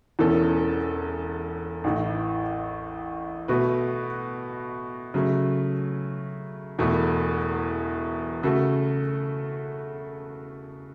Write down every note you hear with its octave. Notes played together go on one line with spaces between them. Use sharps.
E1 E2 E3 C#4 A4
A1 A2 E3
B2 A3 F#4 B4
C#3 F#3 A3
E1 E2 B2 A3 E4
C#3 A3 F#4 A4